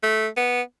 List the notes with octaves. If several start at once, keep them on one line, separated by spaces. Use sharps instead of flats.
A3
B3